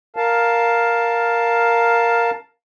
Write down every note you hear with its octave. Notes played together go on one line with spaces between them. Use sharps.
A#4 F5 A5